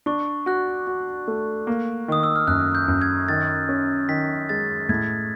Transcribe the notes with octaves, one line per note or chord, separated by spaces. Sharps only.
D4 C#6
F#4 F#6
F#4
A3
A#3
D#3 D#6
E6
F6
F#2 F#6
G6
F#2
G#6
D#3 A6
C#4
D#3 B6
G#3 A6
A2 G#6